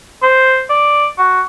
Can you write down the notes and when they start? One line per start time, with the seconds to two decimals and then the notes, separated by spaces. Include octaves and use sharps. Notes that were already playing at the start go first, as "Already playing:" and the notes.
0.23 C5
0.70 D5
1.18 F#4